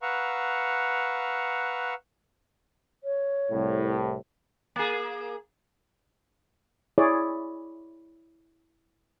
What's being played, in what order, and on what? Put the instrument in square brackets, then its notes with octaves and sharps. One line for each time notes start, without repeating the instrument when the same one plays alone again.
[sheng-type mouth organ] B4 F5 F#5 A#5 C#6 E6
[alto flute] C#5
[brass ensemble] C2 A2
[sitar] A#3 G#4
[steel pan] E4 G#4 C#5 D5